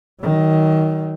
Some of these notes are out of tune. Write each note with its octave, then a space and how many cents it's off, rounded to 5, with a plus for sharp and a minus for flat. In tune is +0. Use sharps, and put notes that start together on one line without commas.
D#3 +20 F#3 +40